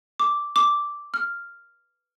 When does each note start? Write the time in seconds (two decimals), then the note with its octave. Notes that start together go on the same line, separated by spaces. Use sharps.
0.20 D6
0.56 D6
1.14 F6